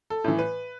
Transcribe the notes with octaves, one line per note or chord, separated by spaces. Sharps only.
A4
A2 E3
B4